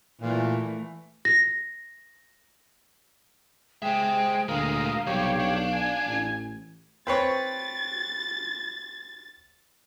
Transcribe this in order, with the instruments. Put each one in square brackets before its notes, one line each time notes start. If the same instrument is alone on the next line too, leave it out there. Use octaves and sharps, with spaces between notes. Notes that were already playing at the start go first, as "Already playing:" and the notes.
[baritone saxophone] A#2 [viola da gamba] E3 A3
[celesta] A#6
[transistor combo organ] G#3 [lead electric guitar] C5 E5 [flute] G5
[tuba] D2 [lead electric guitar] A#2 G#3 [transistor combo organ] A#4 D#6 [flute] F5
[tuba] B1 [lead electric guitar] C3 G3 [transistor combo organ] G4 C#5
[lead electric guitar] D4
[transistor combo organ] G#5
[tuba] A1
[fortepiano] C4 B4 C#5 [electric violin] A6